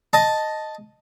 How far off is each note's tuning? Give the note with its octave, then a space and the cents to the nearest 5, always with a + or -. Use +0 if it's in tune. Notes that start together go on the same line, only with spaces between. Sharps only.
D#5 +0 A5 +0